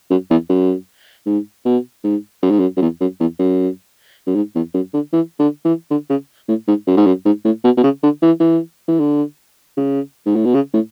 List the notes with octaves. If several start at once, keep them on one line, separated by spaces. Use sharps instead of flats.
F#2
E2
F#2
G#2
B2
G#2
F#2
G#2
F#2
F#2
E2
F#2
E2
F#2
F#2
G#2
E2
F#2
D3
E3
D3
E3
D3
C#3
A2
G#2
F#2
G#2
F#2
G#2
A2
B2
B2
C#3
D3
E3
E3
E3
D3
C#3
G#2
A2
B2
C#3
A2